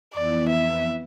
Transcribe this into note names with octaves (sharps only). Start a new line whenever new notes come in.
F2 E3 B3 E4 D5
E5